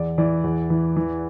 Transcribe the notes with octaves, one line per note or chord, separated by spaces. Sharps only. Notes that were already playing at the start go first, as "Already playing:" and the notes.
Already playing: E2 D5
E3 D5
E2
E3
E3